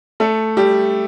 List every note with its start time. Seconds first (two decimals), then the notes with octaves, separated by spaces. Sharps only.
0.20 A3 A4
0.57 G3 G4